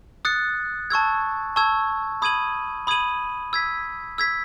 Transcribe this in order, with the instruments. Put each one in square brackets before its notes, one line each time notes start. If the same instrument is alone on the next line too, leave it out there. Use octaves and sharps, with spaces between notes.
[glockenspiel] D#6 F#6 A6 C#7
A5 C#6 E6 G#6
A5 C#6 E6 G#6
B5 D#6 G#6 D#7 F#7
B5 D#6 G#6 D#7 F#7
E6 G#6 B6
E6 G#6 B6